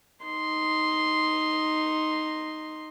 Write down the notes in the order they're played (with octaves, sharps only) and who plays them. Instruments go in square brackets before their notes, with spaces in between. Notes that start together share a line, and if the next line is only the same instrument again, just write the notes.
[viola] D#4 C6